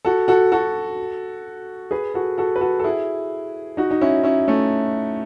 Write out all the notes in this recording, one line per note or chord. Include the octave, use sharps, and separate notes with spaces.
F#4 A4
F#4 A4
F#4 A4
G#4 B4
F#4 A4
F#4 A4
B4
F#4 A4
A4
E4 G#4
D#4 F#4
D#4
C#4 E4
C#4 E4
A3 C#4